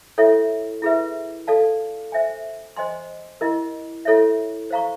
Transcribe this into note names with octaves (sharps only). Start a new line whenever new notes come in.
E4 A4 C#5 E5 G5
E4 G#4 B4 E5
A4 D5 F5 A5
C5 E5 G#5
C5 D#5 G#5 C6
E4 G4 A#4 D#5
E4 A4 C#5 E5
C5 F5 A#5 C#6